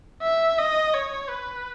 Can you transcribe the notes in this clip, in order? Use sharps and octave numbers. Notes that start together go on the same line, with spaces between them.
E5
D#5
C#5
B4